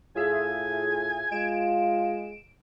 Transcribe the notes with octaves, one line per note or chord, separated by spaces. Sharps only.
A2 F4 G#4 E5 G#5
G#3 F4 D7 E7